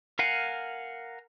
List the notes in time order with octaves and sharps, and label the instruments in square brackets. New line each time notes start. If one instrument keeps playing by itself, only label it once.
[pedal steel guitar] A#4 F5 F#5 G#5